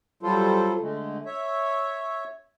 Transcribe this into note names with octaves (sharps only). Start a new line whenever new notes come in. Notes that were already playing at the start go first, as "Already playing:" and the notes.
F#3 G3 F4 A4 C5
D3 G#3 A3
C#5 E5